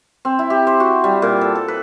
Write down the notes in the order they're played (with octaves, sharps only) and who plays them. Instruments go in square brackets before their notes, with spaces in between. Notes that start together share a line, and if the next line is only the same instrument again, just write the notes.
[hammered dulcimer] C4
E4
G4
C5
F#4
G3
A#2
A4
A4
B4